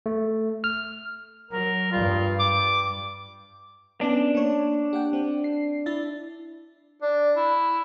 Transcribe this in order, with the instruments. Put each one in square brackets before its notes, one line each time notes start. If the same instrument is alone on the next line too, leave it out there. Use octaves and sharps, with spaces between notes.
[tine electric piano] A3
F6
[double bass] F#3 [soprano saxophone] A#4
[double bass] G2 G3 [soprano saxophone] F4
[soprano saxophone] D6
[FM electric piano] B3 C#4 [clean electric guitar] D4
[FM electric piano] A#3 C#5
G4 F#5 G5
C4
C7
E4 E5 A6
[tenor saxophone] D4
E4